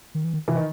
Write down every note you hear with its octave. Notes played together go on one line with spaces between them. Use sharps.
D#3
E3
D#3
C3 E3
D#3